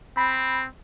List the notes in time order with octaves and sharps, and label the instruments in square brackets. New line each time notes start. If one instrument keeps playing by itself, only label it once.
[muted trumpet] C4 [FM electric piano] B5